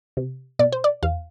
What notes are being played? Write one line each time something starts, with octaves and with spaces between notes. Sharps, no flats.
C3
B2 D5
C5
D5
E2 F5